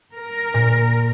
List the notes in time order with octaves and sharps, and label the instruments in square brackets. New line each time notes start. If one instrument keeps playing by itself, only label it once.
[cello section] A#4
[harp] A#2